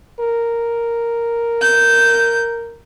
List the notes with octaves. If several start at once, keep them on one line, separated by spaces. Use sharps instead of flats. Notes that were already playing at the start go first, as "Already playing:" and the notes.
A#4
G6